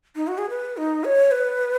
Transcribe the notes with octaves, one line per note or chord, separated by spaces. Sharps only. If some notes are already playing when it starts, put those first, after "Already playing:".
D#4
F#4
G#4
B4
D#4
C#5
B4